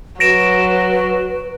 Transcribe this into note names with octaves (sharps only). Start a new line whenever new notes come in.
F#3 F#4 B4 A#6 D7 E7